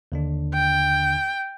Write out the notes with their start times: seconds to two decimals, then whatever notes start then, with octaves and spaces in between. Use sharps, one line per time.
0.12 D#2 D3 D4
0.54 G5